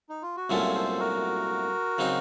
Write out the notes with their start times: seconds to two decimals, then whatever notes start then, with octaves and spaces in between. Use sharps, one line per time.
0.09 D#4
0.22 F4
0.36 F#4
0.50 C2 A#2 F#3 A3 C#4 F4 A4
0.74 A4 C5
0.99 F#4 A#4
1.98 C#3 F#3 C4 D#4